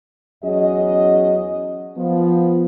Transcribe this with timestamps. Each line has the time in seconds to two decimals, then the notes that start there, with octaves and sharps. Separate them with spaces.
0.44 E2 F#3 C#4 G#4 D#5
1.98 F3 B3